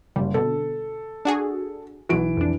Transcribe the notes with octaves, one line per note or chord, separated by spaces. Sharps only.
F#1 G3
B2 D3 A4
D4 F#4 G#4
B1 E3 F#4 D7
F2 D4